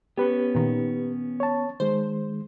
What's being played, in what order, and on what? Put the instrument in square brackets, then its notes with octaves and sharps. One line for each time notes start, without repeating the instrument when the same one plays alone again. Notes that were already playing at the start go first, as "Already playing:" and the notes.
[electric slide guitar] B3 C#4 [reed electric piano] G4 B4
[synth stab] A#2 D#3
[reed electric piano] C#5 A5
[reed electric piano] D#3 G#3 [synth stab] C5